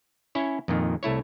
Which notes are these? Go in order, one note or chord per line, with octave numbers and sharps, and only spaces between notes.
C#4 E4 C#5
F2 A#2 D#3
C2 A3 E4 C#5